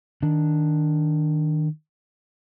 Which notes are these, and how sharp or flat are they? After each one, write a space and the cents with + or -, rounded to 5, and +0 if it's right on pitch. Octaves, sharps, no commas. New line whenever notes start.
D#3 +0 D4 +0